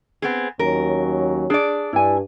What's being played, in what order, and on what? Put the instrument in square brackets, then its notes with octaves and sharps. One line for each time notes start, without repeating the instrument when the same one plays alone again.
[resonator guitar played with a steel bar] B3 C4 G#4
[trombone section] D#2 F#3 C#4 [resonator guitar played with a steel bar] A#4
[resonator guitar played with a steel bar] D4 D5 [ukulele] G#4
[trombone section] G2 [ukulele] E4 G#5